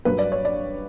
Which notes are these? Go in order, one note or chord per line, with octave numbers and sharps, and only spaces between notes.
G2 F#3 B4
D5
C#5
D5